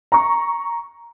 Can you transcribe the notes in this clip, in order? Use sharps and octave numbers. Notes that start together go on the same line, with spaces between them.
A#5 C#6